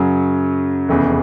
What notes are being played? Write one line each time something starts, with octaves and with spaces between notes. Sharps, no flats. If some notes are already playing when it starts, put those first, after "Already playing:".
Already playing: F#2 C#3 F#3
F1 E2 C#3